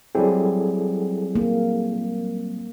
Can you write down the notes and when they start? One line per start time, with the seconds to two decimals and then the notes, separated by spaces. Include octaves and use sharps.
0.15 F#3 G3 C4 E4 G#4 A4
1.36 A#3